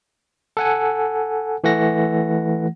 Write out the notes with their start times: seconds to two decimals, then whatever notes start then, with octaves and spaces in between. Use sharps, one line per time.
0.57 A4 F#5 G#5
1.64 E3 A3 F#5 A#6